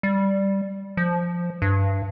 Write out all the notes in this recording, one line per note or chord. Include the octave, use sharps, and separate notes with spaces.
G3
F3
G2